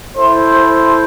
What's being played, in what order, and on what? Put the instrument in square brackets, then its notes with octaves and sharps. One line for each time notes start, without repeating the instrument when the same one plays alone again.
[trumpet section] E4 A4 C5